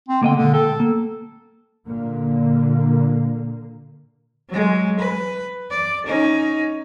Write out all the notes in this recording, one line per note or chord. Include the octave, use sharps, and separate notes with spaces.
C4
D3 A#3 D#5 G5
A#2 D3 G#3
A4 G5
A#3
A#2 D3 A#3
F#3 G#3
B4
D5
C#4 D#4